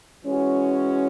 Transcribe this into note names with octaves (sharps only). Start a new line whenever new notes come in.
E3 G#3 C#4 F#4